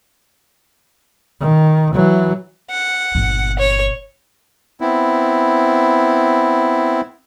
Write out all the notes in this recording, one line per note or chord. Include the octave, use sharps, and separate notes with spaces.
D#3
E3 F#3
F#5
G1 A#2
C#5
B3 C4 E4